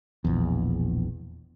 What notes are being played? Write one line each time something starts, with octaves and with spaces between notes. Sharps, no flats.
E1 A#1 E2